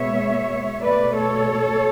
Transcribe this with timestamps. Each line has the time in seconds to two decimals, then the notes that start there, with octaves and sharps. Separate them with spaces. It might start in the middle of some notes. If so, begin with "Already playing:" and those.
Already playing: B2 G#3 B3 C#5 E5
0.83 B2 A3 B4 D5
1.17 A4 C#5